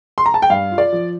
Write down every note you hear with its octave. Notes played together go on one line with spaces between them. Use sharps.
C6
A#5
A5
G5
G2 F5
F4
D5
F3